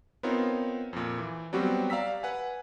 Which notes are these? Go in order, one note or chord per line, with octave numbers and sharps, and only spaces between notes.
B3 C4 D#4 F4 A#4 C#5
F2 A#2
E3
F#3 G3 B3 C4 F#4 G4
D5 F5 A#5 E6 B6
B4 F#5 G#5